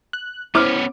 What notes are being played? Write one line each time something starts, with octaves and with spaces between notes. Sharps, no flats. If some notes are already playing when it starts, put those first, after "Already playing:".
F#6
B3 C#4 E4 C5 D6 F6